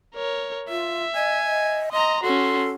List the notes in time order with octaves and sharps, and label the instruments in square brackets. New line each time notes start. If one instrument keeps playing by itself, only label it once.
[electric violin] A#4 C#5
[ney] F4 [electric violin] E5
[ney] D#5 [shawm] G#5
[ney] D#5
[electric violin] D#5 A#5 [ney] C6
[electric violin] C#4 F#4 [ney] A4 [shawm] C6